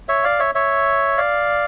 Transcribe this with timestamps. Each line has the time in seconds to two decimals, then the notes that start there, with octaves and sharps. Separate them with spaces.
0.09 C#5 E5
0.24 D5 F5
0.40 C#5 E5
0.55 C#5 E5
1.17 D5 F5